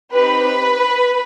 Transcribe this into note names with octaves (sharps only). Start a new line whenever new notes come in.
C4 D#4 G4 B4 B5